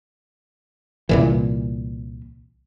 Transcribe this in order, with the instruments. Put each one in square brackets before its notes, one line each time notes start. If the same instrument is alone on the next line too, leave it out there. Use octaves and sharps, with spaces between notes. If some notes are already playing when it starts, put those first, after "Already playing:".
[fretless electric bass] C2 A#2 E3